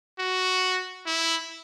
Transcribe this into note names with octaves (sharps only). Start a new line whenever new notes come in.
F#4
E4